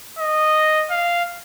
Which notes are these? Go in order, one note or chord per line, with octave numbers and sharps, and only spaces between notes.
D#5
F5